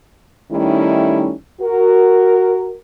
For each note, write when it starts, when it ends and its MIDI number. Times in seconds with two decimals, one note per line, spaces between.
0.51 1.32 51
0.51 1.32 55
0.51 1.32 57
0.51 1.32 61
0.51 1.32 63
0.51 1.32 64
1.61 2.75 66
1.61 2.75 70